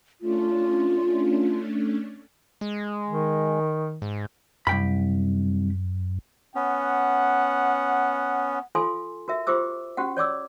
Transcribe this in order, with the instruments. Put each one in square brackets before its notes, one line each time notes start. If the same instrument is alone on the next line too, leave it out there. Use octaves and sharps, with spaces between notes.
[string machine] A3 C#4 D4 [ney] F4
[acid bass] G#3
[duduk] D#3
[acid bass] G#2
[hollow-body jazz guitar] C2 G5 B5 [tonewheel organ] F#2
[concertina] B3 C#4 [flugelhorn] F#5
[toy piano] F4 A4 F5 G#5 C6
F#4 A#4 E5
F4 G4 C5 D6 E6
C#4 F#4 G4 F#5
C#5 D5 D6 E6